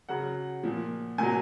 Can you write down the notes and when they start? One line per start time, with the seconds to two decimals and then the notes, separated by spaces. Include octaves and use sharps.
0.09 C#3 F#3 F#5
0.63 A#2 F3
1.18 A#2 F#3 G#5